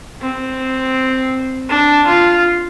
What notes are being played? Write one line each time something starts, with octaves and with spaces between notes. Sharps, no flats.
C4
D4
F4